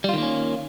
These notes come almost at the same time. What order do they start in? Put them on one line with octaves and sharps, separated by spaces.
G3 F4 D#3 A#3 C#4